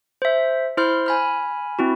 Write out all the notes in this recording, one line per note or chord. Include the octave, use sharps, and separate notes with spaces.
C5 E5
E4 C5 C6 F6
G#5 B5 F6
C4 E4 F#4